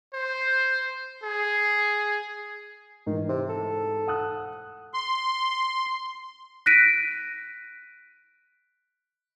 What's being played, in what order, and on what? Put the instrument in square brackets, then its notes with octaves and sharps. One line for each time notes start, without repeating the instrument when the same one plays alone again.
[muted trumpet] C5
G#4
[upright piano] G#2 E3 [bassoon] D#3
[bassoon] C3
A4
[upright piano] F#5 D#6 F#6
[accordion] C6
[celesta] F#6 A#6 B6 D7 D#7